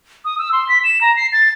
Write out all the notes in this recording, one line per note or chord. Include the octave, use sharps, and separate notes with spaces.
D#6
E6
C6
B6
E7
A#5
C7
A6